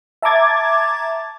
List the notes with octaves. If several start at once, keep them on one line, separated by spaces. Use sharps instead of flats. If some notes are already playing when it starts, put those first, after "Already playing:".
E5 A5 A#5 D6 G#6 A6